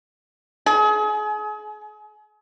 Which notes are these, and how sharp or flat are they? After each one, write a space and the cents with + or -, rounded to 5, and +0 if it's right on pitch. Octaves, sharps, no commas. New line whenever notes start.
G#4 +35